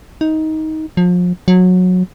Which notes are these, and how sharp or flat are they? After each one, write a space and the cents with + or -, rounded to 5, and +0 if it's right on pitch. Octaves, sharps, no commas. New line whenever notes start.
D#4 +15
F3 +35
F#3 -20